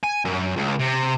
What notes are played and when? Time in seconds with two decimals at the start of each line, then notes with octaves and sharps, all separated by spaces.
0.03 G#5
0.25 F#2
0.57 C#2
0.80 C3